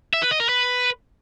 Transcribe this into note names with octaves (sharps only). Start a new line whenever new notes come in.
E5
B4
D#5
A#4
B4